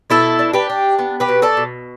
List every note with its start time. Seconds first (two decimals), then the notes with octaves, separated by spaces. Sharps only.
0.10 B2 E4 A4
0.39 D4
0.54 G4 B4
0.70 D4
0.99 B3
1.20 G4 B4
1.28 B2
1.42 A4 D5
1.57 B2